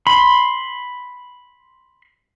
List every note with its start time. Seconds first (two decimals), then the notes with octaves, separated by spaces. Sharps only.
0.07 B5 C6